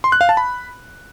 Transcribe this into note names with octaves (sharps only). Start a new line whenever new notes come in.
C6
F#6
F5
A5
B5